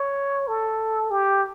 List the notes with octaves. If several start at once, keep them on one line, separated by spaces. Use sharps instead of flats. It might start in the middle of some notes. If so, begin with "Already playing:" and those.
Already playing: C#5
A4
G4